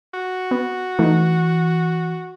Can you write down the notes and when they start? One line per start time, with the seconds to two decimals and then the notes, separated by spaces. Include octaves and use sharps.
0.14 F#4
0.51 B3
0.99 E3 A3 D#4